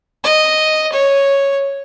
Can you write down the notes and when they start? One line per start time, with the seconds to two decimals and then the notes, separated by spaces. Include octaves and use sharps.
0.24 D#5
0.92 C#5